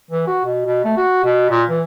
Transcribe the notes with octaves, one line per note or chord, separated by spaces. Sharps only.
E3
F#4
B2
B2
A3
F#4
B2
A#2
E3